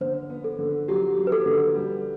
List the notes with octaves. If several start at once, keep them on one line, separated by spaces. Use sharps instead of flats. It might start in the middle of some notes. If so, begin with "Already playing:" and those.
D3 C5
B3
A4
D3
F#3 G4
F#3
B4
A4
D3
G3